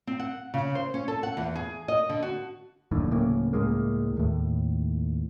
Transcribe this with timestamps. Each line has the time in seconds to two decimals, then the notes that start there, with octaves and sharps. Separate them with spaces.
0.07 C4
0.20 F#5
0.54 C#3
0.75 C5
0.94 C#4
1.08 A4
1.23 F#5
1.37 E2
1.55 G#4
1.88 D#5
2.09 D3
2.22 F#4
2.91 F#1 D#2 A2 D3
3.11 D1 A2 C#3 A#3
3.53 C#2 A2 G#3 A#3
4.17 D#2 A2